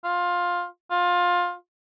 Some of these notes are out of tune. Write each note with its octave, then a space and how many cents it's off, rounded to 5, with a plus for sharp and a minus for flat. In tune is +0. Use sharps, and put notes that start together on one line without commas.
F4 +15
F4 +20